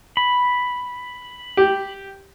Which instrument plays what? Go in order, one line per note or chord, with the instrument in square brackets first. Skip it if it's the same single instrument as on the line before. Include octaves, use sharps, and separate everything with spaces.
[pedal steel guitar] B5
[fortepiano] G4